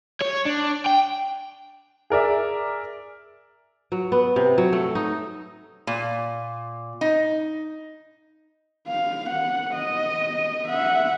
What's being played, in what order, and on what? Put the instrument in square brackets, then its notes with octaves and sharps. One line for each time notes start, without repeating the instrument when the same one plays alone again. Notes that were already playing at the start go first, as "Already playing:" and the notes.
[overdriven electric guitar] C#5
D4
G5
[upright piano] G#4 A#4 D5 E5
[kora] F#3
B3
C3
F#3
A3
D#4
[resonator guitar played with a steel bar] A#2
D#4
[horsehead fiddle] F5
F#5
D#5
E5 F#5